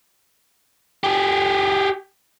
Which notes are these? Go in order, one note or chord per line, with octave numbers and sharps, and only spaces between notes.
G4 G#4